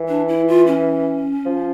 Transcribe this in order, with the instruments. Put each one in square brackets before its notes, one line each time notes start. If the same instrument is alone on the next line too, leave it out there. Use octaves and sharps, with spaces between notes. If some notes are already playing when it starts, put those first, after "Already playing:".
Already playing: [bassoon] E3
[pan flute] D4
E4
F4
C#4
[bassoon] F3